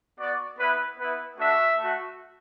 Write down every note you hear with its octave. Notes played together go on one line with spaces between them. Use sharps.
B3 F#4 D5
B3 E4 B4
B3 E4 B4
A3 D4 F#4 E5
A3 F#4